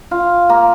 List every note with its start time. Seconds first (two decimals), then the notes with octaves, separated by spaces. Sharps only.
0.11 F4
0.49 A#3